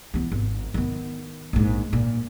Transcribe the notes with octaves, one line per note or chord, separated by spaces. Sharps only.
E3 B3
G#1
D#3 B3
A#1 G#2
A#2